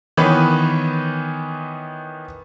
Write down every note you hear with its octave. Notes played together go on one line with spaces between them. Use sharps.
D#3 E3 B3 B4 C#5